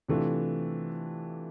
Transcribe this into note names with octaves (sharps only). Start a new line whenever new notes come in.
C3 E3 A3 D4 F4